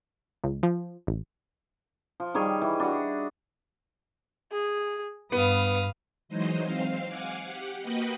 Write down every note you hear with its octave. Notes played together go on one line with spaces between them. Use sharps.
C#2
F3
A1
F3
D#3 G3 G#4 C#5
E3
D4 F#4 F#5
G#4
G2 B3 B4 F5 D#6
E3 F#3 G#3 D#4 C5 D#5
C4 F5 C7
F5 F#5 G#5 D6
G4 F#5
A#3 F#4 B4 D#5 G5 B5